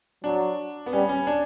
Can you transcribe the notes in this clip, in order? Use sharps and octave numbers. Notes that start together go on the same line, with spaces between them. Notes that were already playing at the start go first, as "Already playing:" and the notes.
F#3 D4
B3
G3 C#4
C#4
D4